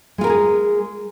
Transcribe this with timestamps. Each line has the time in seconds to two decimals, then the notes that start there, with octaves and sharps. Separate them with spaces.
0.18 G#3
0.21 F4
0.24 A#4
0.27 F#4
0.30 G#4